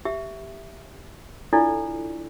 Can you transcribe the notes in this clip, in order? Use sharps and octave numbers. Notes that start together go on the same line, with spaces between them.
G4 E5
D4 E4 F4 A4 D5